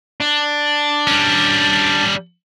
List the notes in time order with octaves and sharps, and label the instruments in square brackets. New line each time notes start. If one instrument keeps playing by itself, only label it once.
[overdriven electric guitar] D4
[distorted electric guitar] G3 C#4